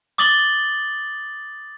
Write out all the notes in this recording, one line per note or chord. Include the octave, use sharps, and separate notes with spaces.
D6 D#6 A6 F#7 G7